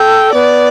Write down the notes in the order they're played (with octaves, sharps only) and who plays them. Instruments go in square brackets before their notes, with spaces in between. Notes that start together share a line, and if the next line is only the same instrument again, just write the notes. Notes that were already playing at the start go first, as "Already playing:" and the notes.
Already playing: [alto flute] A4 [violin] G5
[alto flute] B3 [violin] D5